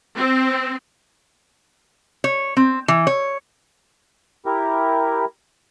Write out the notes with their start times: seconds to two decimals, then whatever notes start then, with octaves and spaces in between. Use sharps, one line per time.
0.15 C4
2.24 C#5
2.57 C4
2.88 E3
3.07 C#5
4.46 E4 G4 A#4